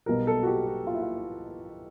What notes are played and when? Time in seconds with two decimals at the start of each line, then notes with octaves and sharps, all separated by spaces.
0.06 B1 B2 G3 A#4
0.27 A4
0.43 F#4
0.47 G4
0.67 F#4
0.87 F4
0.94 E4
1.02 F4